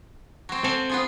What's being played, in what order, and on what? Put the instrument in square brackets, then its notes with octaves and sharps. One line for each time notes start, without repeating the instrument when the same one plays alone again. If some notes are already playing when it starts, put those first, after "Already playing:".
[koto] F#3 C4
[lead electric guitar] C4 [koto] A4 F5 G#5
[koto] B3 F4 G#4